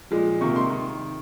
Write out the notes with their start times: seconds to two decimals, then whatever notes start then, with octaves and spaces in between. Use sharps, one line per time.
0.11 A#2 F3 G#3
0.41 C3 D#3 A#3 C#6
0.56 C6
0.70 D#3